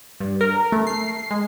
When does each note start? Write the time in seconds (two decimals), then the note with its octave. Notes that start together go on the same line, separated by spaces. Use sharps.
0.20 G2
0.41 A#4
0.72 A3
0.87 C7
1.31 G#3